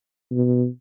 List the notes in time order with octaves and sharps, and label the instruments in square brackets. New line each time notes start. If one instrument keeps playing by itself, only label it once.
[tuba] B2